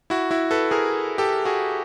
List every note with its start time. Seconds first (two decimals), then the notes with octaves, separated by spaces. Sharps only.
0.10 E4 F#4
0.31 E4 F#4
0.51 A4 B4
0.71 G#4 A#4
1.18 G4 A4
1.45 F#4 G#4